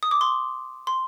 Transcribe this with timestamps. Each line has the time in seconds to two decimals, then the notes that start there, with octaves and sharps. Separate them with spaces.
0.03 D#6
0.11 D6
0.21 C6
0.87 C6